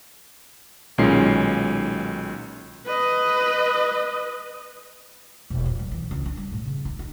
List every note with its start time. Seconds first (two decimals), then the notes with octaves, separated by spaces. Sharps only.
0.98 B1 A#2 D#3 G#3 C#4 C7
2.87 B4 D#5
5.50 E1
5.66 A#2
5.79 F#3
5.92 E3
6.11 C#2
6.26 D4
6.37 G3
6.52 A2
6.66 C#3
6.85 E4
6.99 D#4